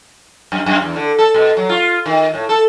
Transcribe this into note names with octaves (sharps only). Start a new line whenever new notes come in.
F#2
F#2
E2
D3
A4
B2
F#3
F4
D#3
A2
A4